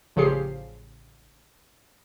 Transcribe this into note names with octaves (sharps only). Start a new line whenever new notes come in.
A1 C#3 F3 G4 G#4 C7